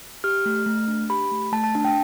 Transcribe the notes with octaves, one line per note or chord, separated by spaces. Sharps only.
G4 F6
A3
A3
D4
G4 B5
A3
A3 A5
A5
D4 A5
G5